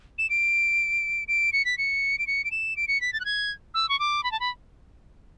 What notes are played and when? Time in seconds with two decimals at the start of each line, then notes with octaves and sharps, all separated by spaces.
0.18 E7
0.30 D7
1.28 D7
1.53 C#7
1.65 B6
1.78 C#7
2.19 D7
2.27 C#7
2.44 D7
2.51 E7
2.77 D7
2.88 C#7
3.01 B6
3.13 A6
3.20 F#6
3.25 G#6
3.74 E6
3.89 C#6
3.99 D6
4.23 B5
4.32 A5
4.40 B5